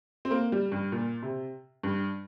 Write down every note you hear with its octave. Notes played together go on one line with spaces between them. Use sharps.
C4
A#3
G3
G2
A#2
C3
G2